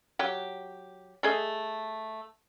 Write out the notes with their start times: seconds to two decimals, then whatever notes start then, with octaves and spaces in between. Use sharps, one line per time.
0.19 F#3 G4
1.23 A3 G#4 D#5